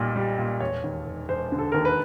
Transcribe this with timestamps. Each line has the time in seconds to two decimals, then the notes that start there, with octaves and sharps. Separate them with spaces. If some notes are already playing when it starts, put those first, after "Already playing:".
Already playing: B1 A#2 G3
0.16 G3
0.38 A#2
0.60 E1 C#5
0.84 D#2
1.06 E1
1.29 E1 C5
1.52 D3
1.59 A4
1.72 D#2 A#4
1.85 B4